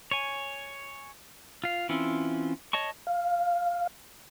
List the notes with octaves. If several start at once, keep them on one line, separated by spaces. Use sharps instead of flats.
C#5 G#5
F4 F5
E3 C4 C#4 E4 F4
C#5 D#5 A5 C#6
F5